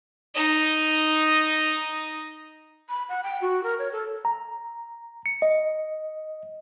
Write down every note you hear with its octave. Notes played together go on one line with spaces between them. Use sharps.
D#4 D#5
B5
F#5
G5
F#4
A#4
C#5
A4
A#5
C#7
D#5